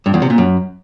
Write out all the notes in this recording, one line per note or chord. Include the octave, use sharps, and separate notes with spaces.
G2
E2
C3
A#2
F#2